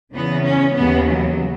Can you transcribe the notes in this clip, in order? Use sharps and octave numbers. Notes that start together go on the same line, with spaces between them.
E2 C#3 E3 B3
C#4
D#2 C#3 E3 B3
F#3